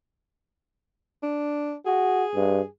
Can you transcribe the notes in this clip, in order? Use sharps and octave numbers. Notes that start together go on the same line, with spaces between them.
D4
F#4 G#4
G2